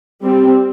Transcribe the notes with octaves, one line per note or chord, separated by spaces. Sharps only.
G3 C4